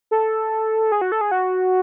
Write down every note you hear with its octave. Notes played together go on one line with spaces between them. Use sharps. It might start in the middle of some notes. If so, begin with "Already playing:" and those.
A4
G#4
F#4
A4
G#4
F#4